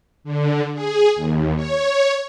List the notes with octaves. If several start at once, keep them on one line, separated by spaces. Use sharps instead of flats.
D3
G#4
D#2
C#5